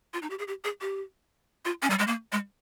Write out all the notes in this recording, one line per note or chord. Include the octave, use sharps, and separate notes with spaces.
F4
D#4
G4
G#4
G4
G#4
G4
F4
C#4
G3
G#3
A#3
G#3